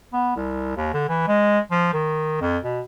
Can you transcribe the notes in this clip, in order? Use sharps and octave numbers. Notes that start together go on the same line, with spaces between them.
B3
C2
D#2
D3
E3
G#3
F3
D#3
F2
B2